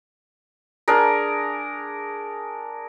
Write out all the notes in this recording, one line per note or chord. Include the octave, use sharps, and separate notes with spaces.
D4 G#4 A#4